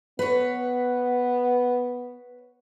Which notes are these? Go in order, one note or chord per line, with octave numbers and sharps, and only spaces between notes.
B3 B4 C#5